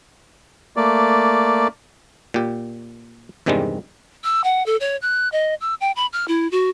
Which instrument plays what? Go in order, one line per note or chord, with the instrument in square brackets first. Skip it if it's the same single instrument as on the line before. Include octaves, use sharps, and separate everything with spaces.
[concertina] A3 A#3 D5
[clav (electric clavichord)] A#2 G4
E2 G2 C3 D#3 G3 G#3
[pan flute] E6
F#5
A4
C#5
F#6
D#5
E6
G5
B5
F6
E4
F#4